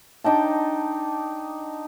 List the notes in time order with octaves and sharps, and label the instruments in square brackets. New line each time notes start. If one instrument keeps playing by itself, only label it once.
[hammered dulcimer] D4 D#4 G5 A5